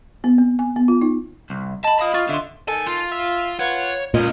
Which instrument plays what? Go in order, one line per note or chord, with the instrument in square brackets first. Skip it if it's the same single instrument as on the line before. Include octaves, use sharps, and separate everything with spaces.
[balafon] B3
C4
G#5
B3
F4
D#4
[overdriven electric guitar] C2
[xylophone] D#5 B5 [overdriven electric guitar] A5
[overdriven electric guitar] F4 B5 [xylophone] D#5 F5 D#6
[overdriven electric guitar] F4 [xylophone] C#6 A6
[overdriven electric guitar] D3 [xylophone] E5 C6
[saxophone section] D#3 A4 [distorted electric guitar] G#5
[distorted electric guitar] F4
[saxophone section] E5 F5
[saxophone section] F4 B4 F#5 [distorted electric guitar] C#5
[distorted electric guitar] C#2 [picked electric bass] A#2 [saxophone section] C#4 D#5